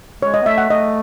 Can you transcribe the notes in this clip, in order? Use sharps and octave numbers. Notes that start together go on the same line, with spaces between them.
G#3 C#5
D#5
B3
A3 E5
F#5
A3 D#5